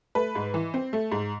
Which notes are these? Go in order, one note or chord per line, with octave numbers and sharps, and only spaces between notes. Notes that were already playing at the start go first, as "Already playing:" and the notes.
A3 B4
G#2
E3
C4
A3
G#2